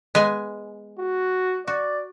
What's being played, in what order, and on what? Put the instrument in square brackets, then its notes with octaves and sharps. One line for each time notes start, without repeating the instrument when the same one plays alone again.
[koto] G#3 B3 G#5
[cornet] F#4
[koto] F#4 [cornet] D5